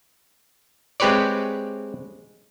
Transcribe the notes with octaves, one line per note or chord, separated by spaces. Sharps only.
G#3 C4 G4 B4 C#5 D5